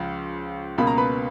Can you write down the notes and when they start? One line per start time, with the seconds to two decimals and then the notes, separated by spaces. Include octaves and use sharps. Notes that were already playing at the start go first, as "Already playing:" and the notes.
Already playing: C#2 C#3 F3
0.78 C#2 B2 A#3 B5
0.87 A#5
0.97 B4 B5